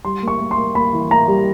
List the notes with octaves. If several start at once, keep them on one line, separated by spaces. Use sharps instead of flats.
G3 C6
A#3
C#6
A#3
C6
A#3
A#3 B5
E3
A#3 A#5
G3